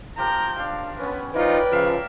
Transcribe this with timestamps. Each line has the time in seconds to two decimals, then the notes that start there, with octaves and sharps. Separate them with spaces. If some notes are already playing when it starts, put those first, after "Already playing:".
0.18 F3 G4 A#4 A#5 G6
0.59 D4 F5
0.99 B3 C#4 B4
1.34 E3 F3 D#4 F4 A#4 B4 D5 G5
1.72 C#3 F3 A#4 E5 F5